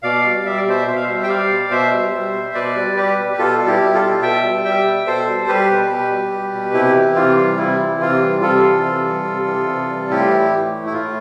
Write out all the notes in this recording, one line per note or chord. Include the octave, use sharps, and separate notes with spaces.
B2 D5 F5
G3
G3 E5
D5
B2 C5 E5
B2 E5
F5
G3 C5 E5
G5
G3 D5 F5
B2
B2 C5 E5
G3
G3
B2
B2 B4 D5
G3
G3 G4 B4
B2
G4
B2 F4 A4
G3
E4 G4
G3
F4 A4
B2
B2 E5 G5
G3
G3 E5 G5
B2
B2 A4 C5
G3
G3 G4 B4
B2
B2
G3
G3
B2
C3 E4 G4
E3
C3 F4
G3
C3 E4
E3
C3 F4
G3
C3 F4 A4
E3
C3
G3
C3
E3
C3
G3
A2 E4 G4
E3
A2
A3
E4
A2 F4